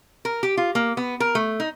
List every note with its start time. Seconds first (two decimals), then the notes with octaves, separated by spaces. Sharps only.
0.25 A#4
0.43 G4
0.57 F4
0.75 A#3
0.97 B3
1.20 A#4
1.35 A3
1.60 D#4